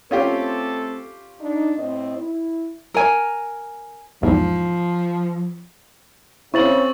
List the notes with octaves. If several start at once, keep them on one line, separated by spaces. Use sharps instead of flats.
A3 C4 C#4 F4 G4 A4
D4 D#4
A2 C4 D#5
E4
A#4 G#5
B1 E2 G#2 F3
C#3 C4 E4 C#6 A6 F#7